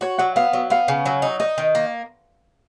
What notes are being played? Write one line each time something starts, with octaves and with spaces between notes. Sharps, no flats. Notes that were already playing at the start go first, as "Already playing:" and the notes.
F#4 C#5
F#3 F#5
B3 F5
F#3
B3 F5
C#3
F#3
D#4
D#4 D#5
D#3
A#3